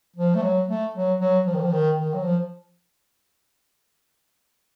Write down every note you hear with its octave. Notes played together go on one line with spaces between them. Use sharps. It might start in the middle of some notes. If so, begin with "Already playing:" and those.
F3
A3
F#3
A3
F#3
F#3
F3
D#3
F3
D#3
D#3
F#3
F3